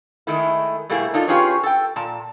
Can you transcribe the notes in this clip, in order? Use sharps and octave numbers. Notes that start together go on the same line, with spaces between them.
D#3 G#3 A3 E4
B2 G3 A3 A#3 E4 G#4
D4 D#4 F4 A4
C#4 F4 G4 G#4 B4 C#5
A4 G5
A#2 A5